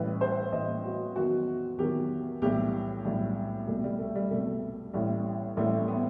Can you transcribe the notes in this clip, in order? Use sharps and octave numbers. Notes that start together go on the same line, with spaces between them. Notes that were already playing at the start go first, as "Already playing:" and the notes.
Already playing: A1 A2 E3 G3 B4
C5
A1 A2 E3 G3 D#5
F#4
E2 D#3 F#3 F#4
E2 D#3 F#3 G4
B1 A2 E3 G3 G4
B1 A2 E3 G3
C2 B2 G3 A3
G3
A3
G3
C2 B2 G3 A3
A1 A2 G3
A1 A2 G3 A3
B3